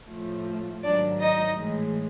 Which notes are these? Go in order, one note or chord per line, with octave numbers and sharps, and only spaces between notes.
A2 F3 A3
G#2 D#3 F#3 D4 D5
D#4 D#5
A2 E3 G#3